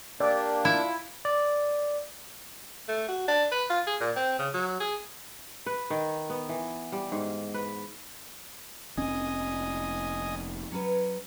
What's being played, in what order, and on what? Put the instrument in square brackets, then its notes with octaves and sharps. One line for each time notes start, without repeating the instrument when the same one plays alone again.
[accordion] A#3 D4 [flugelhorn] G4 [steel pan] D5
[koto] E4 [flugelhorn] F4
[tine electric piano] D5
[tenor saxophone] A3
F#4
D4
B4
F4
G#4
A#2
C4
C#3
F#3
G#4
[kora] B4
D#3
B3
E3
G3
G#2
B4
[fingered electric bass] F1 C4 C#4 [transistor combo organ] D#5 G#5
[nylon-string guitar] F#3 C#4 B4